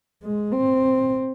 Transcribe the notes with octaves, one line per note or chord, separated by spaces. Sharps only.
G#3
C4